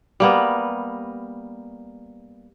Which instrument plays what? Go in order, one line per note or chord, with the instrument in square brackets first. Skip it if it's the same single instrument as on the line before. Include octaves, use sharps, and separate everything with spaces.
[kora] G3 A#3 B3